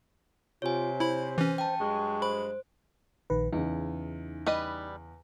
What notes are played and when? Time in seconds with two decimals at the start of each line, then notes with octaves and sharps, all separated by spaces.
0.62 C3 F4 C#5 G#5
1.00 E4 C5 B5
1.38 E3 C#4
1.58 G5 A5
1.79 G2 F#3 G#3 C#6
2.22 C5 B5
3.30 A#1 D#3 B4
3.53 E2 C#3 D#4
4.46 G3 B4 D#5